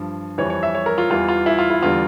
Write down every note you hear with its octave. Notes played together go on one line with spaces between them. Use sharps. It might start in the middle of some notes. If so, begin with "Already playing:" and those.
Already playing: G2 F3
F2 E3 G3 C#5
C#5
E5
C#5
A#4
F4
E2 E3 G3 F4
F4
E4
F4
E4
E2 D3 G3 F4